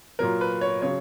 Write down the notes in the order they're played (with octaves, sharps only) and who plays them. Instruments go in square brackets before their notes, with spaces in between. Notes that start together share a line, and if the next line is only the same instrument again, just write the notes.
[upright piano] A#2 F#3 A#4
B4
C#5
C#3 F#3 C#5